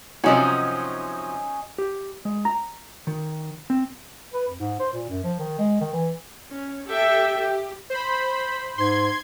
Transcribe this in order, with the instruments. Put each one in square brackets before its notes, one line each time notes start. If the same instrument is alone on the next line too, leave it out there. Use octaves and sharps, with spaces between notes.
[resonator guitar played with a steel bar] C3 F3 F#4 [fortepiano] F#3 C#4 D#4 [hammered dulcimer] D#5 G#5
[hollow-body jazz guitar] G4
G#3
A#5
D#3
C4
[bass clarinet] B4
F2
G#2
C5
A#2
F#2
F3
D#3
G#3
D#3
E3
[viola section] C#4
G4 A4 E5 G5
G4
[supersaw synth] C5 B5
[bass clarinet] G#2 [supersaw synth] C6 G#6